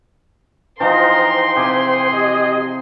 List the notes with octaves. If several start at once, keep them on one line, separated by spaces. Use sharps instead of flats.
E3 F3 D#4 C5 G5 A#5 C6
C3 G#4 D6
G4 D#5